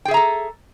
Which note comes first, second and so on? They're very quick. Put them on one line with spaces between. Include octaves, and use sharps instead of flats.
G5 G#4 E5 A#5 A4